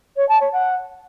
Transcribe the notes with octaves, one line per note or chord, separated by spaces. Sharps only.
C#5
A5
C#5
F#5